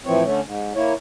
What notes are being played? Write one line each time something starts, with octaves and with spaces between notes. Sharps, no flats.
A2 E3 F3 C4 C#5
D3 A3 C#4
G#2
A#3 E4 C#5